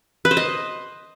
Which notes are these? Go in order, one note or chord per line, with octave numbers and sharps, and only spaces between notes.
B4
C5
D#5